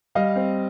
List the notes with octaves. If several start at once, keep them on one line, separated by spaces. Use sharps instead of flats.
G3 D#5 F5
C4